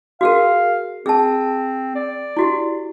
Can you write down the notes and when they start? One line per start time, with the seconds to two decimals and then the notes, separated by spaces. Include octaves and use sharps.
0.21 F#4 G#4 A#4 F5
1.06 C4 G#4 A5
1.96 D5
2.37 E4 F#4 G4